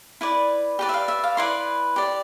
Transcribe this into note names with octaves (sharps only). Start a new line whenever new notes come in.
E4 B4 D5
G4 B4 D5
E5
F5
E5
F5
E4 B4 D5 C6
G4 D5